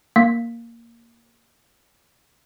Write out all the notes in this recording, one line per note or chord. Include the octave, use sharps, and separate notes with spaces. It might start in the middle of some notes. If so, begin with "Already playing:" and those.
A#3 B6